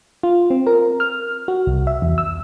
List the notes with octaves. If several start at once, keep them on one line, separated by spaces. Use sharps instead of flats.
F4
C4
A#4
F6
F#4
C2
E5
E2
E6